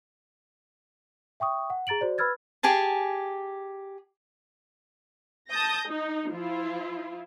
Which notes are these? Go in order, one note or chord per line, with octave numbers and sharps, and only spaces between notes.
E5 G5 C#6 D#6
F#5
G#4 A#5 A6 D7 F#7
F#4 C5 D5
B4 B5 E6 F6 G#6 A6
G4 G#4 G#5 A5
A5 D#6 G6 A#6
D#4
F3 E4 F4